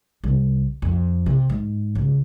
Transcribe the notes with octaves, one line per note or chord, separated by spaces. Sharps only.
C2
F2
C3
G#2
C#2